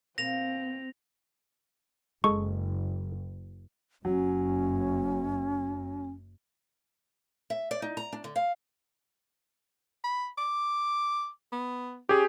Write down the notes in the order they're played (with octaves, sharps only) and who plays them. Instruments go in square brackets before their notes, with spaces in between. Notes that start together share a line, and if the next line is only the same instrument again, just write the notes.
[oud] B2 A#3 [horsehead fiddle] C4 [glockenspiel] A#6 F7
[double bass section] F#1 [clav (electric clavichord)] G#3 G#4 A4 [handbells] C#6
[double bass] F#1 F#2 [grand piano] F#3 [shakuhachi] C#4
[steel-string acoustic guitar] E5
D5
D#4
A#5
D4
D3
F5
[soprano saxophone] B5
D6
B3
[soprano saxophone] C#4 [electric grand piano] G4 G#4